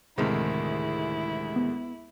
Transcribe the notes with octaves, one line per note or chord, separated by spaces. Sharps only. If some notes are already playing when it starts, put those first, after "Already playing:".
D2 A2 C3 D#3 G#3 E4
B3